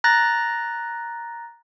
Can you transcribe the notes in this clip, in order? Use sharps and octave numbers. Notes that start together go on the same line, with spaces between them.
A#5 F#6 A6 A#6